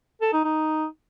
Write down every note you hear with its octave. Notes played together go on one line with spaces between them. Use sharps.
A4
D#4
D#4